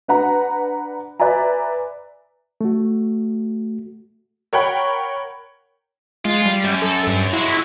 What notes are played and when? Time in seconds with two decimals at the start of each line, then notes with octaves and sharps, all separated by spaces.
0.08 D4 B4 F#5 A#5
1.20 B4 D5 E5 G#5 A#5
2.61 A3 F#4
4.53 A#4 C#5 F#5 G5 B5
6.25 G#3 F4
6.45 G3
6.65 F#2
6.82 A4
7.07 G2
7.33 F#3 G#3 E4